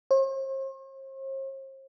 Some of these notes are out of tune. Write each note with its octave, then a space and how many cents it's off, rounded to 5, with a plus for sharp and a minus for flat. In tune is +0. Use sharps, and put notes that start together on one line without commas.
C5 +45